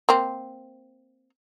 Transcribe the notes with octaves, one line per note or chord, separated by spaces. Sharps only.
A#3 C4